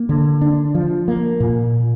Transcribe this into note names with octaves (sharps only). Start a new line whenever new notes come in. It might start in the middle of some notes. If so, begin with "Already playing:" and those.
Already playing: A#3
D3
D4
F3
A#3
A#2